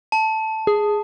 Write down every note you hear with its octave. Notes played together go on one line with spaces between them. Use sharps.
A5
G#4